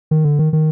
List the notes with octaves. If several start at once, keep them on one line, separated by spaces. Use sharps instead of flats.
D#3
D3
D#3
D#3